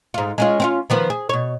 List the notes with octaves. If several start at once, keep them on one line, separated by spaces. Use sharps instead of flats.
G#2 F4
G#3 C#4 F4
C4 C#4 F4
D#3 F3 B3
G#4
B2 C#5